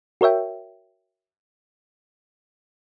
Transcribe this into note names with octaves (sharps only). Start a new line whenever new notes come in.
F#4 A#4 C#5 E5 G5